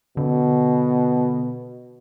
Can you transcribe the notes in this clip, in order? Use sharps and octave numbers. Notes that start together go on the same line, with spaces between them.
B2 D3